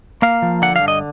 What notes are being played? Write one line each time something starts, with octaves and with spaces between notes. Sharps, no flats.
A#3 F5
F3
D3 F#5
F5
G2
D#5